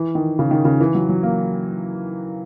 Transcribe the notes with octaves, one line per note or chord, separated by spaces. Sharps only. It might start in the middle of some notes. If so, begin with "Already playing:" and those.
Already playing: E3
D#3
C#3
D#3
C#3
E3
F#3
F#3
A#3